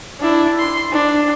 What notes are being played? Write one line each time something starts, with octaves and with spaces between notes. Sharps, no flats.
D4 E4
C6
D4